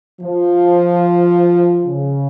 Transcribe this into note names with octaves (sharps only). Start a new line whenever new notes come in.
F3
C#3